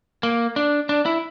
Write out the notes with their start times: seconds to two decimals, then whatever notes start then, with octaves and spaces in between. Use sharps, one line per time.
0.23 A#3
0.56 D4
0.89 D4
1.06 E4